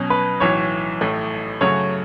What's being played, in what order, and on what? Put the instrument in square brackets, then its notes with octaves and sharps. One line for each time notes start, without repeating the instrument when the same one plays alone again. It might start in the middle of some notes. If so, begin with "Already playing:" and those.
Already playing: [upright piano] B2 F#3 C#4
[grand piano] B4
[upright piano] B1 A2 E3 [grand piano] C#5
[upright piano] A1 A2 A3
[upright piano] F#2 C#3 F#3 A3 F#4 [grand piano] C#5